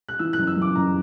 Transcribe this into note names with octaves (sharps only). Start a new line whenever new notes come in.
F#6
E3 E6
F#6
F#1
E6
F#2
D6
F#1 A#5